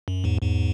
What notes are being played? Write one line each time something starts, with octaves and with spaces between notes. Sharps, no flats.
F#2
E2 G#2
E2 G#2